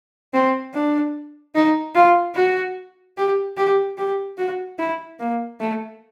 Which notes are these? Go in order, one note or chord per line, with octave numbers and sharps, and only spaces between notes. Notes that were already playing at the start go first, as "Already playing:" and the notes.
C4
D4
D#4
F4
F#4
G4
G4
G4
F#4
E4
A#3
A3